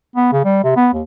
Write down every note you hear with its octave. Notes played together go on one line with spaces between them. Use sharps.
B3
C#3
G3
C3
B3
D#2